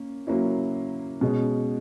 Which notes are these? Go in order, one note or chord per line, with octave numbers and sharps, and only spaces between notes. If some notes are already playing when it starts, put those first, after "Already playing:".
Already playing: A#3 C#4
F#3 A#3 C#4 E4
B2 G#3 C#4